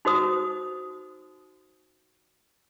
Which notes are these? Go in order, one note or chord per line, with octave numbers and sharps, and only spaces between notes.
D#4 F#4 C5 D#6